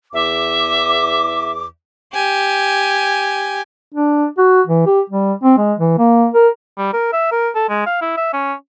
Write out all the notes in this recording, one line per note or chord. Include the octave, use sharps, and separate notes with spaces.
E2 E5 D6
G4 G#5
D4
F#4
E3
G4
G3
C4
G#3
E3
A#3
A#4
G3
A#4
E5
A#4
A4
G#3
F5
E4
E5
C#4